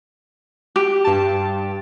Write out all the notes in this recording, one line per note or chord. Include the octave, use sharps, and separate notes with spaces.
G4
G2 A5